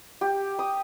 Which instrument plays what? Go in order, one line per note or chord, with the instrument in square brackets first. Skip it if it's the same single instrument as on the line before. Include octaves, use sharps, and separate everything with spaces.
[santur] G4
D#6